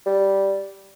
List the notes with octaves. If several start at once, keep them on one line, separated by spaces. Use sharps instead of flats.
G3